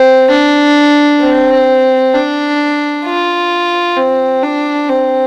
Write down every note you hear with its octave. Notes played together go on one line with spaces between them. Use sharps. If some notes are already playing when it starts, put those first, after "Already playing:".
Already playing: C4
D4
C4
D4
F4
C4
D4
C4